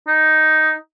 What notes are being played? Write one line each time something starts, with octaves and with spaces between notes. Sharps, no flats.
D#4